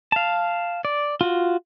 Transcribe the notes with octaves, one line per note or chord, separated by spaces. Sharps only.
F5 A5
D5
F4 F#4